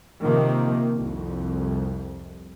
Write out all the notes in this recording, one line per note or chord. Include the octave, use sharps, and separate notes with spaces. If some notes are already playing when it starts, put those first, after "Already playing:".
C3 D#3 F3 A#3
C2 F2